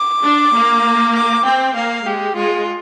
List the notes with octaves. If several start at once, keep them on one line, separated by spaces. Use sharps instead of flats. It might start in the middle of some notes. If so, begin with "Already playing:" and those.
Already playing: D6
D4
A#3
D6
C4 G5
A#3 F5
G#3 G4
G#3 F4